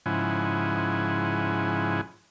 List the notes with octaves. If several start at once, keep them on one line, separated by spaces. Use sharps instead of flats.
G#2 C#3 F3 E4 F#5 G#5